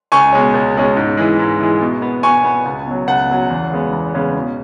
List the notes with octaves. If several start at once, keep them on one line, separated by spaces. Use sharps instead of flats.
C#2 G#5 C#6
B2 G#3 C#4
C#2
B2 G#3 C#4
G#2
E3 G#3
G#2
E3 G#3
B2
B3
B2 G#5 C#6
B3
C#2
B2 F#3
C#2 F#5
B2 F#3
E2
C#3 G#3 B3
E2
C#3 G#3 B3
B2